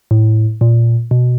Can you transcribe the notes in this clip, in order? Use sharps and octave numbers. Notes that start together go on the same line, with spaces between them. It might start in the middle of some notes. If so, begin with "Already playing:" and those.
A2
A#2
B2